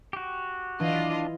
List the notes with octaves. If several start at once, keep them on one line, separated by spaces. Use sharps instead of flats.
F#4 G4
E3 D4 F4 D#5